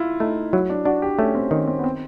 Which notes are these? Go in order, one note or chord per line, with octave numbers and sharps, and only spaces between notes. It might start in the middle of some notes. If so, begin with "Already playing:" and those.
Already playing: E4 F4
A3 D#4
F#3 E4
D4
D4 F#4
G4
A3 C#4
C4
D#3 C#4
C4
B3
C4